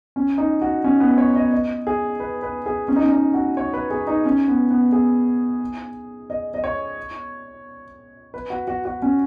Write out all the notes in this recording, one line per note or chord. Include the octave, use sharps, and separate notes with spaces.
C#4
D#4
F#4
C#4
B3
C#5
D#5
D#5
G#4
B4
B4
G#4
C#4
D#4
C#4
D#4
F#4
C#5
B4
G#4
D#4
C#4
B3
B3
G#4
D#5
D#5
C#5
B4
F#4
F#4
F#4
C#4